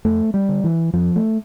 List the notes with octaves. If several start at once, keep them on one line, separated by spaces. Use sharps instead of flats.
F2 A3
G3
D3
E3
F2 F3
A3